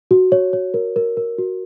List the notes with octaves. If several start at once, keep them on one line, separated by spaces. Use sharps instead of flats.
F#4
C#5
C#5
A#4
A#4
A#4
F#4